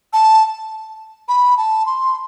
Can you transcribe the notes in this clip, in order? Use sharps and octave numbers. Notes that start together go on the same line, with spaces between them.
A5
B5
A5
C6